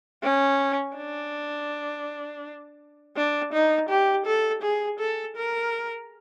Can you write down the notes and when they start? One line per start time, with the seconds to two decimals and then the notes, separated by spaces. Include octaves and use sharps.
0.23 C#4
0.97 D4
3.17 D4
3.53 D#4
3.89 G4
4.26 A4
4.62 G#4
4.99 A4
5.36 A#4